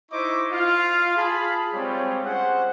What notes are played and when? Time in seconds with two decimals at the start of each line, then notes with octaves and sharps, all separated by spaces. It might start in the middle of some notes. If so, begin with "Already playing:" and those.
0.11 D#4 E4 C5 D#5 C#6 D6
0.51 F4 F5
1.16 G#4 A5 B5
1.73 G3 G#3 C4 F4 C#5
2.24 C#4 G#4 C5 F#5